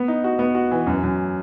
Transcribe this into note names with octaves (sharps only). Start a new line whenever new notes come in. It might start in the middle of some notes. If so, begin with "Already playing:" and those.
Already playing: B3
D#4
F#4
B3
F#4
E3
F#2
F#2